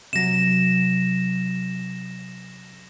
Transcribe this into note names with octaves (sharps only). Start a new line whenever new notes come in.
C3 F#3 A#6 E7